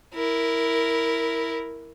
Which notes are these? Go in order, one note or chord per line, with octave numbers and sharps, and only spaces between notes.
E4 A#4